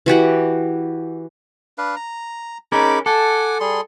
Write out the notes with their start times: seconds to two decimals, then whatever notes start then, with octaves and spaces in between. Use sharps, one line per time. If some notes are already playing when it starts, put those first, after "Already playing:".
0.06 E3 F#4 G4 F#5
1.78 D4 B4 F5
1.96 A#5
2.72 C#4 D#4 G#4 A#4 B5 D6
3.06 A4 F#5 G#5 D6
3.60 G3 G#4 C6